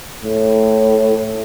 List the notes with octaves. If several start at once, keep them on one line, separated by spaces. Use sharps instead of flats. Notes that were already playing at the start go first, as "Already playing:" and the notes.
A2